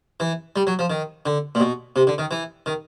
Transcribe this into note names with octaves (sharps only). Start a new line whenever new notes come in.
E3
G3
F#3
F3
D#3
D3
A#2
B2
C3
D3
D#3
E3
D#3